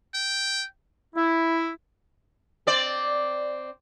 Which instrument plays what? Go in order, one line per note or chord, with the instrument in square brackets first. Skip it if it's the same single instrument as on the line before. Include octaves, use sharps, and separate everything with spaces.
[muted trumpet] G5
[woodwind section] E4
[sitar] C4 D5